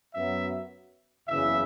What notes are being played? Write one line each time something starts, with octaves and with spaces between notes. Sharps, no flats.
F#2 F#3 B3 E5
F#1 E2 C#3 E3 E5